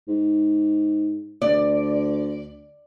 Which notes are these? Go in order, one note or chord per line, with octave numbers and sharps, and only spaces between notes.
G#2
D2 D5